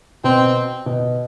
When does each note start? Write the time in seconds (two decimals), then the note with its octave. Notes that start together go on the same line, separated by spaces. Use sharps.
0.24 B2 C4
0.86 B2